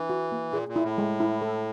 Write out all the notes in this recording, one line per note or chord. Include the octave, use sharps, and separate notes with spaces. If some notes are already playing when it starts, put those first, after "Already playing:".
Already playing: E3 D4
F#4
A#3
A#2 G#4
A#2
E4
A2
G#3
E4
A4